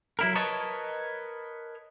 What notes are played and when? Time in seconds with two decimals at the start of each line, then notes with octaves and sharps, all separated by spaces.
0.19 F#3 E4 A#4
0.35 A#4 B4 C#5 D#5 A5